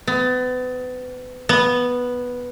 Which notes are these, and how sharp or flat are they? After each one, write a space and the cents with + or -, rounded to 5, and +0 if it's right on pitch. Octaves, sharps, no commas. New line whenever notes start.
B3 +35
B3 -5